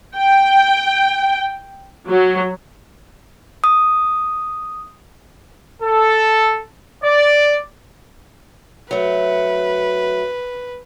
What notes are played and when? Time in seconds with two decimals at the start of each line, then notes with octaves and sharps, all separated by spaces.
0.16 G5
2.09 F#3
3.64 D#6
5.83 A4
7.03 D5
8.91 F#3 A3 B4